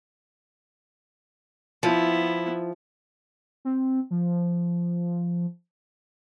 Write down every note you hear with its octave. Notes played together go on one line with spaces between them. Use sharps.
F3 B3 E4
C4
F3